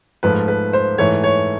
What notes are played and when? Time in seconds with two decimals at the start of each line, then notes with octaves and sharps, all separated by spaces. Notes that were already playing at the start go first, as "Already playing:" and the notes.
0.23 G#2 F3 A3 B4
0.48 B4
0.73 C5
0.98 G#2 E3 A3 C#5
1.24 C#5